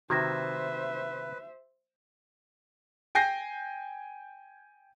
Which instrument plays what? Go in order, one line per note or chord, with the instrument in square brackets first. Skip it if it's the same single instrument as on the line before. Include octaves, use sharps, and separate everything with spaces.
[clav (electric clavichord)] C3 D#3 [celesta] F#4 G#6 A#6 [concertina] B4 [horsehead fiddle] C5 E5
[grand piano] G5 G#5 G6 A#6 C7